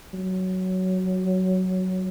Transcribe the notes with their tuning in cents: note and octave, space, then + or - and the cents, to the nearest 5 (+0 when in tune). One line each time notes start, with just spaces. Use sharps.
F#3 +10